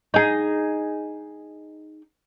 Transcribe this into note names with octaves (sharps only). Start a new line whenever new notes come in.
D#4 G#4